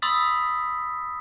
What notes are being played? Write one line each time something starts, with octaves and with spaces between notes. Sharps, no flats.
B5 C6 D#6 E6 A6 B6